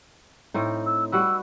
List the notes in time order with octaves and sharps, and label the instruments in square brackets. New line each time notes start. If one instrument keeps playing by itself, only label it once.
[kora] A2 C4 D#4
[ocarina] E6
[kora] G3 F#4 B4 [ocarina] E6